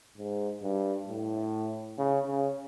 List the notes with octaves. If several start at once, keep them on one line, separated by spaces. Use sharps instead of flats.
G#2
G2
A2
C#3
C#3